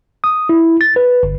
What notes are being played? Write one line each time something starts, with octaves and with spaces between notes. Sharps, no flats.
D#6
E4
A6
B4
G1